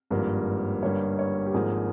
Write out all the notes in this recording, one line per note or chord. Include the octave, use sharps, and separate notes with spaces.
G#1 G2 F3 A#3
G1 G2 G3 A#3 C#5
C#5
G4
G#1 G#2 F3 A#3 G#4